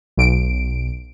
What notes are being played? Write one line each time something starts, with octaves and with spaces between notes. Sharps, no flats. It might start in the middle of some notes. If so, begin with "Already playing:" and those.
B1 D7